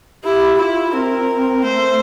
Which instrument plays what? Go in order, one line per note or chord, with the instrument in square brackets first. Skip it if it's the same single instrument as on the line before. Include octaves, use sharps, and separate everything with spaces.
[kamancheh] E4 [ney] G4
[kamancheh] E4 [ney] F4
[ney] C4 [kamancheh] A#4
[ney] A3 [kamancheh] C5